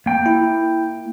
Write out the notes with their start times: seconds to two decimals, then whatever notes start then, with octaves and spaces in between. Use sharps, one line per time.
0.06 A#3 G5
0.26 E4